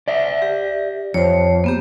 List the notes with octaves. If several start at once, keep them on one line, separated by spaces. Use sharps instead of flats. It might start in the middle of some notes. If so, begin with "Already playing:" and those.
D5 E5
G4
F2 C5 C#5
A#3 B3 G4